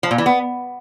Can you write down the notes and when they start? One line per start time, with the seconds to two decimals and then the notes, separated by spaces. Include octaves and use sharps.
0.03 F3
0.11 A#2
0.18 E3
0.26 B3